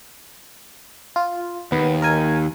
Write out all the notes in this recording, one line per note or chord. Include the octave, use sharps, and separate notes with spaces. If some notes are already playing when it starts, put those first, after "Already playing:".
F4
D#2 B3
A#4 G#5